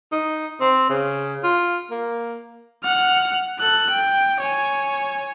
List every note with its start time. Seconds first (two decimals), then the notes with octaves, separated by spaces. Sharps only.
0.12 D#4
0.61 C4
0.90 C#3
1.44 F4
1.91 A#3
2.83 F#5 F6
3.59 A4 F#6
3.90 G5
4.40 C#5 G#5